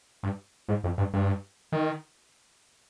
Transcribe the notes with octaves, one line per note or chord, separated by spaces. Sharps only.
G2
G#2
F2
G2
G2
D#3